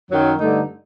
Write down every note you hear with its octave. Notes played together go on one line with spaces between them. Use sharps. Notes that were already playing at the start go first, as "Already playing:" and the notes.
F#2 D#3 F#3
G2 D3 A3 D#4